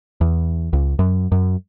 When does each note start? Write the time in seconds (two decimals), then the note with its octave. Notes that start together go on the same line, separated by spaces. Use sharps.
0.21 E2
0.73 C#2
0.99 F#2
1.32 F#2